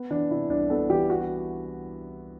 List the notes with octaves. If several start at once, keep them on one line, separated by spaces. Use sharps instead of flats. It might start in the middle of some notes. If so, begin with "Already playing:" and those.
Already playing: B3
E3 D4
C3 E4
C2 D4
B3 A4
E3 G4
F#4